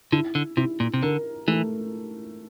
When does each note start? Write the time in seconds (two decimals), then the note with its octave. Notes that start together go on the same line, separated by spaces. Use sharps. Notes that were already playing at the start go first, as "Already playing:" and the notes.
0.12 D3 E4
0.35 D3
0.57 C3 E4
0.80 A#2
0.94 C3
1.02 D3 A#4
1.48 E3 A3